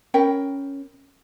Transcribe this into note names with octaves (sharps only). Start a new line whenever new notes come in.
C#4 A#4 G5 B5